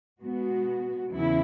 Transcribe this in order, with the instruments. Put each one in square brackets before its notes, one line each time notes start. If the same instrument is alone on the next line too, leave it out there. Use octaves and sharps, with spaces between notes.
[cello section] B2 G#3 B3 F#4
E2 C#3 E4